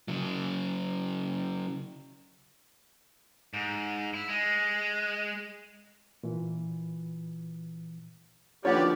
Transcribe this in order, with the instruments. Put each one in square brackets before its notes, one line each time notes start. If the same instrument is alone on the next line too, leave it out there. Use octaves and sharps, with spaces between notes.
[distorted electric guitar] C#3 F#3
[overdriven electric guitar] G#2
E4
G#3
[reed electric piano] A#2 E3
[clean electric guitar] D#2 D3 F3 [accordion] B3 G4 D5 [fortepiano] C#5 F#5